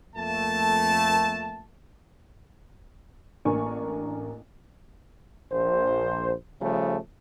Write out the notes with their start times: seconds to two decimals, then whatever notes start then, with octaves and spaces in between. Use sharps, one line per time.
0.16 F2 A3 A#3 A5
3.45 A1 A#3 D4 A#4 G#5 C#6
5.51 A#1 C5
6.61 C#3 F3 G3 A3